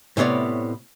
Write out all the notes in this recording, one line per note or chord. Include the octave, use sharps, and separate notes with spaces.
A2 C3 B3 C#5 D5